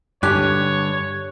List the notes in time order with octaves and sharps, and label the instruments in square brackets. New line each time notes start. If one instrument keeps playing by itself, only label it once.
[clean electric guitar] G2 D3 [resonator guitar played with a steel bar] G4 G#5 A5 [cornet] C#5 [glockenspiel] F#6